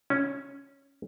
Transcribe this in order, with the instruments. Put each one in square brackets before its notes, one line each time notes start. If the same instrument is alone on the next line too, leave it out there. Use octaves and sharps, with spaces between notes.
[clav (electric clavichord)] C#4